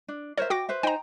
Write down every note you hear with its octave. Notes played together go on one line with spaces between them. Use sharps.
D4
A#4 C5 C#5 E5
F#4 G5 D6 A#6
B4 C5 E5
D#4 C5 G5 G#5 A#5